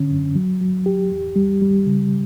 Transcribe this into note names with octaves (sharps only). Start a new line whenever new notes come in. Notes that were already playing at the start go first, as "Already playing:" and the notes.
Already playing: D3 C#4
F#2
F#3
F#3
G4
E2
G3
G3
C#3